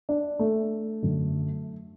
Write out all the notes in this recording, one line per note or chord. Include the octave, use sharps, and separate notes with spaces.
D4
A3
F#2 D3